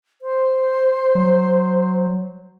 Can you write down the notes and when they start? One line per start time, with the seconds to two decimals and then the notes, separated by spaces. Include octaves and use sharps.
0.22 C5
1.15 F#3